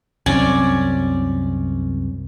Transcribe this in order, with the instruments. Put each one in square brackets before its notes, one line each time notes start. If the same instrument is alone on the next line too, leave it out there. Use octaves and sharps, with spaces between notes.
[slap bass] C2 F#2 C4 [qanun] C#4 D5